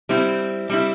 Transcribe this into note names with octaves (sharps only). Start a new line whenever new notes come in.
G3 C4 E4
G3 C4 E4